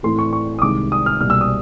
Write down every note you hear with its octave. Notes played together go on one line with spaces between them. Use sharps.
A2 E3 A3 C4 C6
C#6
C#6
D#6
C2 C3 D#3 G#3 D6
D#6
F6
C2 B2 G3 A#3 F6
E6
D#6